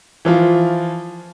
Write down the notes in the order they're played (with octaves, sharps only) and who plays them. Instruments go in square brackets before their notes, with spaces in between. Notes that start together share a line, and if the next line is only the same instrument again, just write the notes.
[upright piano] E3 F3 F4